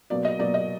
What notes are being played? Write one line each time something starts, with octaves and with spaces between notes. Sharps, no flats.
B2 F#3 A#3 D5
D#5
B2 F#3 A#3 D5
D#5